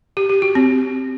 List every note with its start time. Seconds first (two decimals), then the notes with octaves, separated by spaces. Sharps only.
0.17 G4
0.29 G4
0.42 F#4
0.55 C4